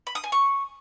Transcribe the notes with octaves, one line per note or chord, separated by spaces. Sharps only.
B5
D#6
G#5
C#6